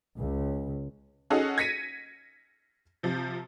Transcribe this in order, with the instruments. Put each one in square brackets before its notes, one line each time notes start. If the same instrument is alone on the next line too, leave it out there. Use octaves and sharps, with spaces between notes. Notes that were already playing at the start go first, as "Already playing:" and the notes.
[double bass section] C#2
[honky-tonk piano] C#4 D#4 F#4 G#4 A4
G#6 A#6 B6 C#7 D#7
C3 F3